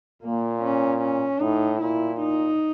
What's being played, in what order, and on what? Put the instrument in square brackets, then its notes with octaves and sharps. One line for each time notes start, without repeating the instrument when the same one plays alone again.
[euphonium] A#2 [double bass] A#3
[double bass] C#4
C#4
[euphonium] A2 [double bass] D#4
[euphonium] A#2 [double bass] E4
[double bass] D#4